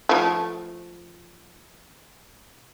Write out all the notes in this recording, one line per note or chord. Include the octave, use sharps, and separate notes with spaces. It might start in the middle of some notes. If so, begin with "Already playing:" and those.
F3 A3